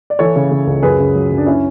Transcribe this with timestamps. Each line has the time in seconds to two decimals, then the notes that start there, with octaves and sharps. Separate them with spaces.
0.10 D5
0.19 E3 A4 C#5
0.36 C#3
0.51 C#3
0.67 C#2
0.83 F#2 G#4 B4
0.99 C#3
1.15 F#3
1.31 F#2
1.38 D4
1.46 C#4 E4